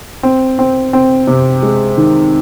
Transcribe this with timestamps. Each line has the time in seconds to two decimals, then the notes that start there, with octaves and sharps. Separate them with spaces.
0.23 C4
0.59 C4
0.93 C4
1.27 C3
1.63 G#3
1.97 D#3